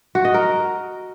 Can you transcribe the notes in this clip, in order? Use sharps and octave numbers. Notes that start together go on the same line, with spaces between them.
F#4
D#5
A#4